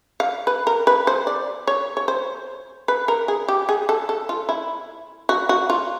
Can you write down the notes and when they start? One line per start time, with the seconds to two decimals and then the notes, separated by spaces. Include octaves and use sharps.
0.20 F5
0.47 B4
0.67 A#4
0.87 B4
1.07 C5
1.27 D5
1.67 C#5
1.97 C#5
2.08 C5
2.88 B4
3.08 A#4
3.28 G#4
3.48 G4
3.69 G#4
3.89 A4
4.09 A4
4.29 F4
4.49 E4
5.29 F#4
5.49 F#4
5.70 F4